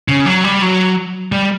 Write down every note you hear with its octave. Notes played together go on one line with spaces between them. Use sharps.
C#3
F#3
G3
F#3
G3